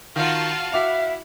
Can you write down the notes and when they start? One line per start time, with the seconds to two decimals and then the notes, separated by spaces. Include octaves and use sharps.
0.16 D#3 F4 F#4 F5 A5
0.72 E4 F#4 E5 D6 F7